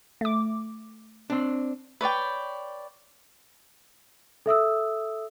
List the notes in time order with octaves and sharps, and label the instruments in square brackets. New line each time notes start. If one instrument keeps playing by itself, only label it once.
[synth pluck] A3 D6
[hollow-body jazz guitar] C4 D4
[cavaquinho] B4 C#5 D5 G5
[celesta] A4 E5 D#6 E6